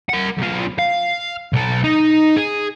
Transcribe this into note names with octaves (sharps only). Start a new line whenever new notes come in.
A#4 F#5
B1 F4
F5
B1 A4
D#4
G#4